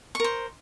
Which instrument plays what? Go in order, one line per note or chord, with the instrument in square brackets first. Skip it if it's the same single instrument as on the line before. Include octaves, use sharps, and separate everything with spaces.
[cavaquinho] C#6
A#4
C5